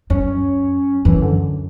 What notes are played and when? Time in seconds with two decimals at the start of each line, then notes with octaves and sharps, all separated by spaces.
0.10 F#2 C#4
1.05 F#2 E3
1.22 D3